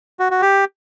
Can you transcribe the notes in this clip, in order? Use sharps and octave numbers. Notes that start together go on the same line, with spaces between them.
F#4
F#4
G4